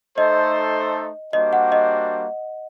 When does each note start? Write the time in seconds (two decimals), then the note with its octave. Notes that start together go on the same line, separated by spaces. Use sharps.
0.17 A3 D#4 A4 C5 D#5
1.33 G3 A#3 D4 F#4 C5 D#5
1.53 F#5
1.72 D#5